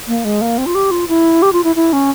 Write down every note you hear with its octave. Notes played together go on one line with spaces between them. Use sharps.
A#3
G#3
A#3
C4
F4
G4
F4
E4
G4
F4
E4
E4
C#4